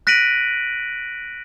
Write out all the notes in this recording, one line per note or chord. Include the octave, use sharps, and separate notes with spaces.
F#6 A#6 B6 D7 D#7 F#7